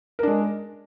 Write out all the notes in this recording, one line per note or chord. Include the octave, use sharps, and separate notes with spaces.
G#3 D4 A#4